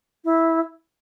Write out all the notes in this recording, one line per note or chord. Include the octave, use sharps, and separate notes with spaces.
E4